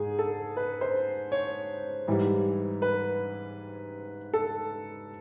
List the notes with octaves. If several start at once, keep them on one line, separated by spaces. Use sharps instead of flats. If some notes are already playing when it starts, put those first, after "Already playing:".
Already playing: G#2 G#4
A4
B4
C5
C#5
G#2 E3 G3
B4
A4